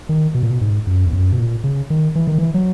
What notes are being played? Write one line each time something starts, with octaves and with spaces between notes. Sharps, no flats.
D#3
B2
A#2
B2
G#2
F#2
E2
F#2
B2
A#2
C#3
D#3
E3
D#3
E3
F#3